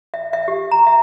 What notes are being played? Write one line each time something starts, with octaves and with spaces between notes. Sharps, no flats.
E5
E5
G4
A#5
E5